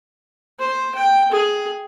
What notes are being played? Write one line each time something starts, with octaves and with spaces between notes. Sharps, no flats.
C5
G5
G#4